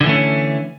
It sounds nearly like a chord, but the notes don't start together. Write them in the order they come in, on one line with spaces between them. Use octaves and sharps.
D3 E3 A3 C#4